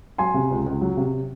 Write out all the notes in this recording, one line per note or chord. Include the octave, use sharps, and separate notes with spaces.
F#3 G#5 C6
C3
C#2
C#2
F#3
C3